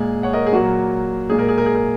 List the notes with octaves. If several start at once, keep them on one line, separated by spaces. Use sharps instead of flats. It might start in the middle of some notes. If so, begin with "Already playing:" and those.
Already playing: A#2 G#3 G#4
C#5 F#5
A#4 D#5
G#4
A#2 F#3 A#3 F#4
A#2 G#3 G#4
A#4
G#4
A#4
G#4
A#4